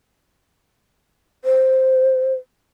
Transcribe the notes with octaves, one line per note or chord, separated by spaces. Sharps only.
C5